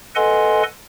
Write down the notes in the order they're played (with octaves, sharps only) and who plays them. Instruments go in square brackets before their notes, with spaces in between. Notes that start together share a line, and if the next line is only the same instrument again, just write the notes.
[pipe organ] A4 B4 D#5 F#5 G#5 C6